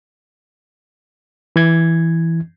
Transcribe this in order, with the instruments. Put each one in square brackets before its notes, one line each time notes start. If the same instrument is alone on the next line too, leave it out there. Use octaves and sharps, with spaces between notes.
[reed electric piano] E3 G#6